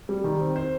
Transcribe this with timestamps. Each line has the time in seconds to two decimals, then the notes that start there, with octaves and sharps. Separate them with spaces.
0.09 G3
0.24 D#3
0.40 C4
0.56 C5